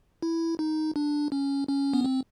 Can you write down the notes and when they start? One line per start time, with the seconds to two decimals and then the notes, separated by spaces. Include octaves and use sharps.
0.22 E4
0.59 D#4
0.96 D4
1.32 C#4
1.68 C#4
1.94 B3
2.05 C4